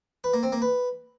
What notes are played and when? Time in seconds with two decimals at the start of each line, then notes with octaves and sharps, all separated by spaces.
0.24 B4
0.34 A#3
0.43 C4
0.52 A#3
0.62 B4